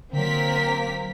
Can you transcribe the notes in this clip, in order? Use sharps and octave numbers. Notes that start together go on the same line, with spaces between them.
D3 F#3 A#3 C4 A#4 B6